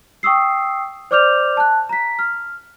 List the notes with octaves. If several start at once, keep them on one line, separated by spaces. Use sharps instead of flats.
G5 C#6 D#6 E6 C7
C5 D5 D6 F6 G6 F7
A5 F#6
A#5 B6
F6